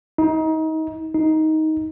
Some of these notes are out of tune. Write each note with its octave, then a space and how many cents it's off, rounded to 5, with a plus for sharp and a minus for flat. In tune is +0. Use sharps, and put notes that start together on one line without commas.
D#4 +30
D#4 +15